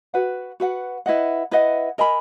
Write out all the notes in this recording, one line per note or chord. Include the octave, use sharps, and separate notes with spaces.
F#4 B4 F#5
F#4 B4 F#5
E4 B4 D#5 F#5
E4 B4 D#5 F#5
A#4 D#5 G#5 B5